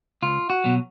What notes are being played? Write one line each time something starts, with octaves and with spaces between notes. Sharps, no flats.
C#2 F4
F#4
B2 F#3